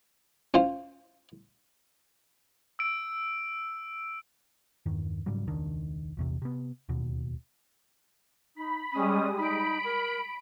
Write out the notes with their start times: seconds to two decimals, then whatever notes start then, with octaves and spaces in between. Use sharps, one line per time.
0.54 C#4 F4 C5
2.79 E6 D7
4.86 E2 G2 D#3
5.26 G#2 C#3 F#3 G3
5.47 E1 C#2 D#3 D4
6.17 A#1 E2 C3
6.42 C3 B3
6.89 D1 D#2 B2
8.56 D#4 B5
8.93 G3 G#3 C#4 D#6
9.38 D#4 B5 D7
9.85 A#4